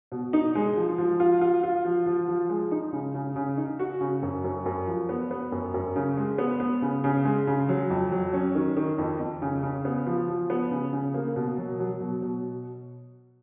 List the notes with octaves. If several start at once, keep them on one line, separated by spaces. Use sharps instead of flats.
B2
D#4
G#3
F3
F3
F4
F4
F4
F3
F3
F3
G#3
D#4
C#3
C#3
C#3
D#4
F#4
C#3
F#2
F#2
F#2
F3
B3
B3
F#2
F#2
C#3
G#3
B3
B3
C#3
C#3
G#3
C#3
F#3
F2
F#3
C#4
D#3
D#3
F2
F2
C#3
C#3
B3
F3
F3
B3
C#3
C#3
A#3
B2
F#3
F#3
B2
B2